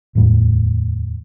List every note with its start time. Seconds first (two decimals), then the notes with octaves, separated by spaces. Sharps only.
0.15 D1 E2 A2 G3